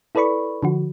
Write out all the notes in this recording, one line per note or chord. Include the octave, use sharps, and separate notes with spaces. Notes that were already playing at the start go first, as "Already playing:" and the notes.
E4 A4 B4 D5 B5 C#6
D3 F3 F#4